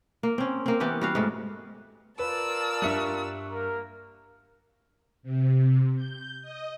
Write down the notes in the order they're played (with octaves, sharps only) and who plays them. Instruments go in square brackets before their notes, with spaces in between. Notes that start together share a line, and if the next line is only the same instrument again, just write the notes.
[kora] A#3
C4 C#4
A#3 C4
E3 B3 C#4 G4
G3 F#4 F5
G#2 G#3 A3
[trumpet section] F4 A#4 [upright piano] B4 [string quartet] D5 A5 E6
[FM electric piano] G2 C#6 F#6 [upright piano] G3 E5
[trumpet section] A#3 A#4
[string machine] C3
G6
D#5